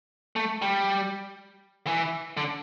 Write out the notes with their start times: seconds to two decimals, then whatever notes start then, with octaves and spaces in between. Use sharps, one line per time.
0.36 A3
0.62 G3
1.87 E3
2.37 D3